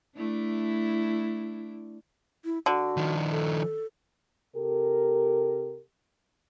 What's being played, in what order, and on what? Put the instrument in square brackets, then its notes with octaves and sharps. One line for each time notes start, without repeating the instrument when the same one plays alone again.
[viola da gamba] A3 D4 E4
[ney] E4
[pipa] D3 [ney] F#4
[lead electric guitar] D#3 F3
[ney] A4
[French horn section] C3 G4 A4 A#4